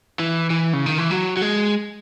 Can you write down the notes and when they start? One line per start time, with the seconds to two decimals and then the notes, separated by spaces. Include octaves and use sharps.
0.19 E3
0.50 E3
0.73 C#3
0.86 D#3
0.98 E3
1.11 F#3
1.37 F#3
1.42 G#3